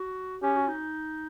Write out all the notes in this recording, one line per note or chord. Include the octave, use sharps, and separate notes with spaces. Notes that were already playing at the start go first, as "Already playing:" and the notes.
Already playing: F#4
C#4 G4
F#4
D#4